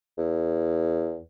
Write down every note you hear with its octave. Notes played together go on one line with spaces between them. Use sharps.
E2